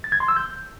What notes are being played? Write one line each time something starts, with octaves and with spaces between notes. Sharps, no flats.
A6
G#6
C6
E6
G6